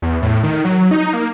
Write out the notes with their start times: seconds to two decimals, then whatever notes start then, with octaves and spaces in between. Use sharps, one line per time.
0.02 E2
0.22 A2
0.43 D#3
0.65 F#3
0.91 D#4
1.13 A#3